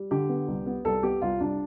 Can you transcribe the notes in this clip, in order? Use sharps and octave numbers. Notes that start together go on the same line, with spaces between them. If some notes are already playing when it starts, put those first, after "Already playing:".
Already playing: G3
D3 G4
B3
C2
B3
C2 A4
B3 G4
C2 F4
C2 D4